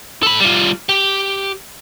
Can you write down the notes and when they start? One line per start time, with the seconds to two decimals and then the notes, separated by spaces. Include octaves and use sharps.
0.23 A4 B5
0.40 G3 F4
0.89 G4